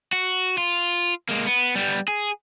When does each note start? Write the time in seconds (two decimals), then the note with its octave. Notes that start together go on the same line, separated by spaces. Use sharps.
0.13 F#4
0.58 F4
1.29 G#3 A#3
1.46 B3
1.76 G3 B3
2.08 G#4